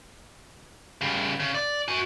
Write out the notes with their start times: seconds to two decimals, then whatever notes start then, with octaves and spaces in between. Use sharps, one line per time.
1.01 C#3 G3
1.40 C#3
1.55 D5
1.88 F#4 G#5